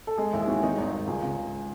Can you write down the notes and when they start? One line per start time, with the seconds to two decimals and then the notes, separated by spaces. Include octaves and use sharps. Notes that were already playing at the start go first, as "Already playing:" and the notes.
0.07 A4
0.18 G#3 G#4
0.33 D#2 E4
0.42 G#4
0.47 D#3 F#4
0.63 D#3 D#4
0.78 G#1
0.92 G#1
1.07 C#2 G#4
1.23 C#3